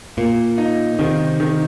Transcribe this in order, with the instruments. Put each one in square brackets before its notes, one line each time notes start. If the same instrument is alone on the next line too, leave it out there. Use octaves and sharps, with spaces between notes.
[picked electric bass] A#2 [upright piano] A#3
[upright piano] D#4
[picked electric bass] C3 [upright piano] D#3
[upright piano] D#3